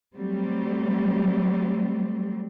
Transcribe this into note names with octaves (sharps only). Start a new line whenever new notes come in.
F#3 G3 A3 C4